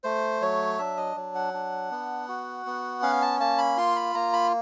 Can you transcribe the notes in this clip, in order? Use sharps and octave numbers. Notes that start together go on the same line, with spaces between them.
A3 C5
F#3 C#5
D4 E5
D#5
F#3
F#5
D4
B3
F#4
B3
C#4 F5
A5
A#3 A5
B5
F4 C6
B5
A#3 A#5
B5